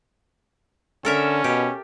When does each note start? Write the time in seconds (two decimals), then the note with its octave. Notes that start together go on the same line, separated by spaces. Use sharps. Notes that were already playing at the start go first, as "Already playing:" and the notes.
1.05 D3 C#4 A4 A#4 E5
1.44 B2 G4